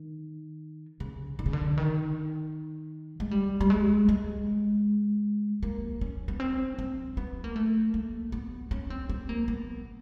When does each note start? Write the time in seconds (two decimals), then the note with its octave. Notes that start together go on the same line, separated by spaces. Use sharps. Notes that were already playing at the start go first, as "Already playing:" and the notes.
Already playing: D#3
1.00 C#3
1.39 D3
1.46 C#3
1.53 D3
1.78 D#3
3.20 G#3
3.31 G3
3.61 G3
3.70 G#3
4.09 G#3
5.63 A#3
6.01 C#4
6.28 B3
6.40 C4
6.79 C4
7.17 B3
7.44 A#3
7.56 A3
7.94 A#3
8.32 B3
8.71 C#4
8.90 C4
9.09 C4
9.29 A#3
9.48 B3